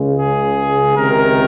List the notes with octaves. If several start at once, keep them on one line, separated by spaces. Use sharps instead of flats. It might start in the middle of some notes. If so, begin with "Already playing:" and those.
Already playing: C#2 C#3 G#3
G#4
C#2 C3 D#3 A#4